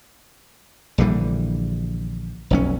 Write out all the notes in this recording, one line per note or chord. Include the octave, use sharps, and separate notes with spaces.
A#1 D3 E3 G3
F1 B1 C#4